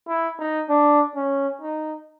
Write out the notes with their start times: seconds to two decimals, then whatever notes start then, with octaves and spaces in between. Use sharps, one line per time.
0.08 E4
0.39 D#4
0.70 D4
1.16 C#4
1.62 D#4